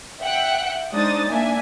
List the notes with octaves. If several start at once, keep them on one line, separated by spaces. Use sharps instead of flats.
E5 F#5 G5 F#6
G#3 D4 D#4 C5 D#6 A6
A#3 D4 E5 G#5